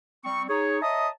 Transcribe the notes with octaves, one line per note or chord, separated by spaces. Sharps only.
G3 C4 C#6
D#4 G#4 C#5
C#5 D#5 E5 A5 A#5 D#6